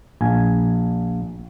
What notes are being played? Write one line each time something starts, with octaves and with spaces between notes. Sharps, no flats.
A#1 G#5